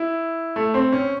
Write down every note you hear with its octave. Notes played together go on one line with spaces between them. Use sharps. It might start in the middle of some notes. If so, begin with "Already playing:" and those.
Already playing: E4
A3
C4
C#4